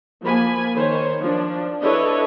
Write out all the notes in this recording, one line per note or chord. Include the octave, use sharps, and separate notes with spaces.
F3 A#3 G#5 B5
D#3 C5 C#5
F3 D4
D4 E4 A4 B4 C#5 D#5